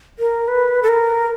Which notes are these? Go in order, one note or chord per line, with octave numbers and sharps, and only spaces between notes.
A#4
B4
A4
A#4